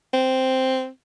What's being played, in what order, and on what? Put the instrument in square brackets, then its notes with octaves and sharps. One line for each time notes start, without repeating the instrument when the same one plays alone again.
[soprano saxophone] C4